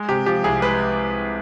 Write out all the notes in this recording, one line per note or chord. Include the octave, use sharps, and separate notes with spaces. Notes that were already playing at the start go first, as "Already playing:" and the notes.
Already playing: G#3
C3 G4
F3 G4
C2 G#4
G#3 B4